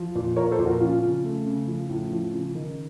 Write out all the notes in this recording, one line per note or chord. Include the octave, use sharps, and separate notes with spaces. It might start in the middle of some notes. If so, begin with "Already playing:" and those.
Already playing: F3
A#2
F3 A#4 C#5
A4 C5
A#2
F#4 A#4
F3 C#4 F4
C#3
A3
C#3
F3
A2
F3
C#3
D#3